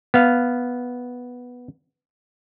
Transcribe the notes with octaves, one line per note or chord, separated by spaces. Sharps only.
B3 F5